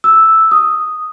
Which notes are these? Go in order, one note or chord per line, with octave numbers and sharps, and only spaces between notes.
E6
D#6